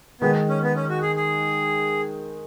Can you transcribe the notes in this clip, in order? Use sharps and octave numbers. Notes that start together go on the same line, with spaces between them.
D#3 G#3 B3 D#4
C#4
B3
C#4
F#4
G#4
G#4